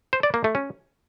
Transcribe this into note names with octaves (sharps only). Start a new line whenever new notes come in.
C5
D5
A#3
A3
C#4